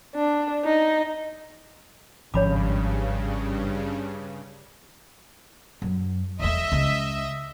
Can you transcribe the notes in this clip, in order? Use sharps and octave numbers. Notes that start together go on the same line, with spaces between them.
D4
D#4
G#1 G2 C#3 F3 C#4 C#5 B5 D6
F#2
E2 A3 D#5 E5
C#2